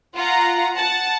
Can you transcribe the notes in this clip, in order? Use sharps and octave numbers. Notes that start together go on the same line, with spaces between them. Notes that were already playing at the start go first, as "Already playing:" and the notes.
F4 F#5 A#5
F#5 A5